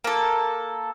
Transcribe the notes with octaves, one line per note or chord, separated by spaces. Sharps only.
A#3 A4